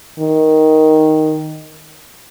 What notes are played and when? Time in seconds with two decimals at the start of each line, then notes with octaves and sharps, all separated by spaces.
0.19 D#3